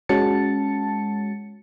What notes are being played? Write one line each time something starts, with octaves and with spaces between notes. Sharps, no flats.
G#3 C#4 F#4 A5 A6 C#7